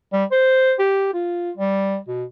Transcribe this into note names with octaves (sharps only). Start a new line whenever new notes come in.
G3
C5
G4
F4
G3
B2